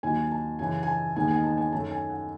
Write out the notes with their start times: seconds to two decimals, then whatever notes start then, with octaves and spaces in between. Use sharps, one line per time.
0.03 D#2 D#3 F#3 G#5
0.31 A5
0.59 F#2 C#3 E3 G#5
0.83 G#5
0.88 A5
1.16 D#2 D#3 G#3 B3 G#5
1.30 G#5
1.44 A5
1.58 G#5
1.72 F#2 D#3 A3 A5
1.91 G#5
2.09 F#5